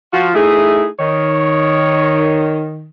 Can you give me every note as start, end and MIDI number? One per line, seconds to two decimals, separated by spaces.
0.13 0.31 53
0.13 0.31 65
0.13 0.28 66
0.34 0.86 57
0.34 0.86 63
0.34 0.86 64
0.34 0.86 68
0.99 2.90 51
0.99 2.67 73